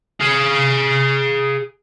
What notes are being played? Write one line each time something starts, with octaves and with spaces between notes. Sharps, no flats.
G#4 F5